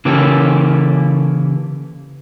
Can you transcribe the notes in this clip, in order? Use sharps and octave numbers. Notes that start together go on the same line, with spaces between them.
C#3 E3 A#3 C#4 G4 A4